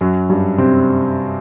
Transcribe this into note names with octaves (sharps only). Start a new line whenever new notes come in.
F#2 F#3
G2 G3
C3 C4